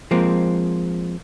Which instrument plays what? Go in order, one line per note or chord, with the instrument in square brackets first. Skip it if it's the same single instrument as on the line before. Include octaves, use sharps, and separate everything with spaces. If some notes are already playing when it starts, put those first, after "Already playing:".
[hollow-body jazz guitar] F3 G#3 A#3 C4